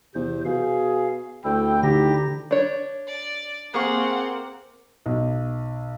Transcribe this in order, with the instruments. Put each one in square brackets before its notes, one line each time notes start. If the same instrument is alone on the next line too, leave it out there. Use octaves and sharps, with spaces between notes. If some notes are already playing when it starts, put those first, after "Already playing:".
[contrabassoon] E2 [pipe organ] C3 C5
[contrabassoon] B2 [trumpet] G#4 [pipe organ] F5
[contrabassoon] D2 [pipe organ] E4 A4 [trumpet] G5
[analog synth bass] D3 [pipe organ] D#4 E4 A#6 [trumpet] G4
[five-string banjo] D4 C#5
[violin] D5
[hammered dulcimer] A#3 [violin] C4 F#5 [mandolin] G#4 F5 C#6
[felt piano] B1